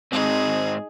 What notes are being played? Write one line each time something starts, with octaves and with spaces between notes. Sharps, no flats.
G#2 C4 D#4 G#4